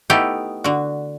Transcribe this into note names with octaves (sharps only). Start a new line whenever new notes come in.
A3 B3 D#4 E4 G4 A4
D3 F#4